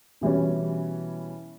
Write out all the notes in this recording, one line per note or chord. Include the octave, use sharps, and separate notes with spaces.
B2 E3 G3 C#4